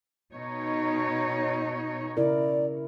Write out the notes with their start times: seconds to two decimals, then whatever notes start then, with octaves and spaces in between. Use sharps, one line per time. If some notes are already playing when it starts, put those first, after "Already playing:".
0.33 B2 D#4 C#5
2.17 C#3 E4 A#4 D5